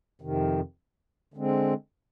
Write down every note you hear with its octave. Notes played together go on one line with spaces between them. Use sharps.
F2 C3 D#3
D3 G#3 C4